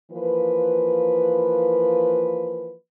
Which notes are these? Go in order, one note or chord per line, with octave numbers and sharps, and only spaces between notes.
E3 F3 A#3 B4